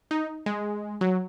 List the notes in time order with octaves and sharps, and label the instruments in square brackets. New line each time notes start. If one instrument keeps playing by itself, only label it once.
[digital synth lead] D#4
G#3
F#3